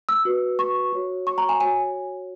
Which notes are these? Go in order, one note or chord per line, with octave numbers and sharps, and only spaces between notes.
E6
F#4 B4
C#6
F#4 C#5
C#6
A#5
G#5
F#4 C#5 G#5